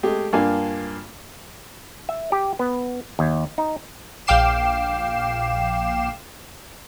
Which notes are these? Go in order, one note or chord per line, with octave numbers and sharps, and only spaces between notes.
G#3 A3 G4 G#4
G2 A#3 D4 F4 F5 G#5
E5
G4
B3
D#2
D#4
A#1 F5 G5 D6 C7 E7